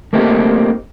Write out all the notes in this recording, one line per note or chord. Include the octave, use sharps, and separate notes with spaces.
A3 A#3 C4 D#4 G4